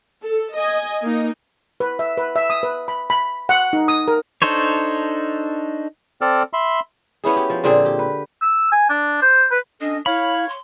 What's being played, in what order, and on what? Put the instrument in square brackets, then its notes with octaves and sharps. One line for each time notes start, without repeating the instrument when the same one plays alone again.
[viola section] A4
D#5 G#5
A#3 D#4
[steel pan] B4
E5
B4
E5
D#6
B4
B5
B5
F#5
D#4
D#6
A#4
[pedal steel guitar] D4 D#4 A4 C5 C#5
[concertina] C4 A4 D5 E6 F6
E5 B5 C6
[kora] B3 C#4 E4 G#4
G4
F3
A#2 D3 C4 G#4
G4
B4
[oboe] E6
G#5
D4
C5
B4
[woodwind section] C#4 A4 D#5 [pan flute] D4
[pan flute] E4 [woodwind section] C#5 [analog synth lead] F5 [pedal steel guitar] B5
[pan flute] C6